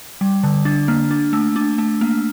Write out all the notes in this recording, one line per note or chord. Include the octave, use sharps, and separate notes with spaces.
G3
D3
D4
A#3
D4
A3
D4
A3
A#3